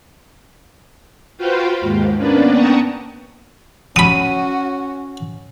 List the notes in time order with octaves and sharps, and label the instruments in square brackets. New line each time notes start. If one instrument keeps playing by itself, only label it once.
[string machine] F4 F#4 B4 C5 F5 G5
D#2 G#2
A#3 B3 C#4 D4 B4 D5
F#5 G5 A5 A#5 C#6 D#6
[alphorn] C#4 [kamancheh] F#4 [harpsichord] B5 D#6 [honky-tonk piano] D#7